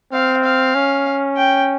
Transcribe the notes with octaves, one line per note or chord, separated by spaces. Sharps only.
C4 F5
F5
C#4
G5